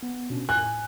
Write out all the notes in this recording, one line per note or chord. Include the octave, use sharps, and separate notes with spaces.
B3
B2 C#4 D4
A2 G#5 F#6